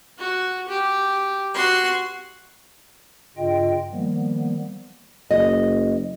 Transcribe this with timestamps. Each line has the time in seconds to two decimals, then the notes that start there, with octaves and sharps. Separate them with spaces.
0.17 F#4
0.68 G4
1.54 F#4 C6
3.37 G2 C#3 F4 D#5 G5
3.92 D#3 F3 G3 A#3 B3
5.31 F#1 D#5